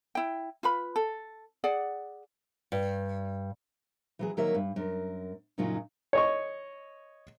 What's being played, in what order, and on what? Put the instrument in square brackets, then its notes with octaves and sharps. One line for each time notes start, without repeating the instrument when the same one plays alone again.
[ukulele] E4 G5
F4 B4 B5
A4
G#4 D5 F#5
[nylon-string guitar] G2
[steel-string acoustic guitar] E3 F#3 G#4
D#3 F#3 A#3 A#4 C#5 E5
G2
F#2 A#4
F#2 A#2 C#3 F#3 D#4 F4
[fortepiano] C#5 D#5 C#6